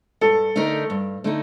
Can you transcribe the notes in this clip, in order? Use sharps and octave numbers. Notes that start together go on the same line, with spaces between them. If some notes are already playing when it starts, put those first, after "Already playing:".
G2 A4
D3 A3 D#4 A#4
G2
D3 A3 D#4